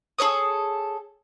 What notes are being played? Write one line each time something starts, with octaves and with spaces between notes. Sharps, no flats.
G#4 A4 C#5 D#6